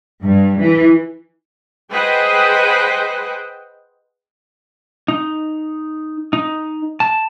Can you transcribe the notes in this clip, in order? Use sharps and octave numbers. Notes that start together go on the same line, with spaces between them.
G2
E3
G#4 B4 C5 D#5 F#5 G5
D#4
D#4
A5